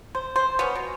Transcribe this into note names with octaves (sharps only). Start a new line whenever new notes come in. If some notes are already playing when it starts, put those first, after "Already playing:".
C5
C5
B3 C#4
B2